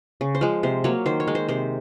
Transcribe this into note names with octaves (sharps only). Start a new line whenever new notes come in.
C#3
C5
F3 G#3
C3 C5
F#3 A#3 C#5
D#3 C5
C#5
G#3
C5
C3 C5